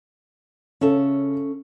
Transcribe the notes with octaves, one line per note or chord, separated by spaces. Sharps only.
C#3 C#4 A4 E5